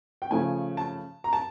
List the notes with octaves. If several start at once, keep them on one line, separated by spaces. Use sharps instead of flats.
G5
C#3 F3 A3 G#5
A5
A#5
A5